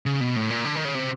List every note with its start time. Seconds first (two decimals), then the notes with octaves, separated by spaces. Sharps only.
0.06 C#3
0.21 B2
0.36 A2
0.50 A#2
0.65 D3
0.75 D#3
0.85 C#3
0.95 C3